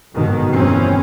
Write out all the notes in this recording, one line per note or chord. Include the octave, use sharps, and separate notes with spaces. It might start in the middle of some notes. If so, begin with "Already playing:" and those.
G1 G#2 B2 D#3
G1 E2 C4 C#4